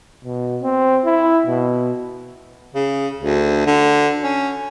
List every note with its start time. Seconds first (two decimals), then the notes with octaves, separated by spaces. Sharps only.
0.24 B2
0.62 C4
1.05 E4
1.46 B2
2.75 C#3
3.19 D2
3.67 D3
4.23 C#4